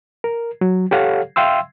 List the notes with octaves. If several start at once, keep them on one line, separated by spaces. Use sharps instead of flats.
A#4
F#3
G4 A4 C#5 F5 F#5
E5 F5 G5 C6 E6